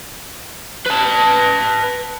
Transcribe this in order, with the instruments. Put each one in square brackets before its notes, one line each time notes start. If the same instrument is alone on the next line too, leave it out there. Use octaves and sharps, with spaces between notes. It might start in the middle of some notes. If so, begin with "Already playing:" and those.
[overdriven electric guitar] B4 A5